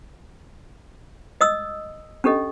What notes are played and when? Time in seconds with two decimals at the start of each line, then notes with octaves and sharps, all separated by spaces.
1.41 D#5 D#6 E6
2.24 C#4 D4 G4 A4 D#5